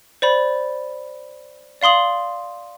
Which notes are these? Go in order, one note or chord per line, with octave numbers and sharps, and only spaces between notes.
C5 D5 B5
D5 F5 C6 D#6 F#7